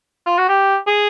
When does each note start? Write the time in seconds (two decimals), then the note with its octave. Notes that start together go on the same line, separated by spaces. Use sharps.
0.26 F4
0.38 F#4
0.49 G4
0.87 G#4